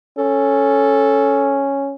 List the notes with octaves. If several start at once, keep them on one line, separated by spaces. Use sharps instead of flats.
C#4 A4